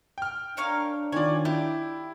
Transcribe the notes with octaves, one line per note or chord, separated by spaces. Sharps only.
G5 F6
D4 A#4 C#5 F5
D#3 F4 C#5 D5 G#5
E4 G4 D5 A5